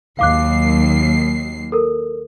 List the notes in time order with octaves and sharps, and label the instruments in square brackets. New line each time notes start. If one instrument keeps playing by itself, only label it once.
[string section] D#2 F#3 C7 [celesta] F5 D6 F#6
[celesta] A4 A#4